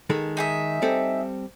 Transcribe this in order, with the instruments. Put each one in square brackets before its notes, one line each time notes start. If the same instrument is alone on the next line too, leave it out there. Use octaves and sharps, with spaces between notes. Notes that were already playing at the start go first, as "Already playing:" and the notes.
[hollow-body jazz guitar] D#3 G#3 A4
[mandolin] D#4 G#4 E5
[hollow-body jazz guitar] G3 C4 A4